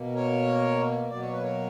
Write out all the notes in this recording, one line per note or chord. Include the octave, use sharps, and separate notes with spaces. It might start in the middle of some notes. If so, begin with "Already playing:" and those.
Already playing: B2 A#3
A#4 C#5
B2 F#3 A#3 D5
C#5
B4
A#4 C#5